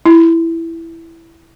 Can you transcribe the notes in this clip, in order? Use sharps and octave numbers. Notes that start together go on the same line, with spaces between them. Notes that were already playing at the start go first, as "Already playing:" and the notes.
E4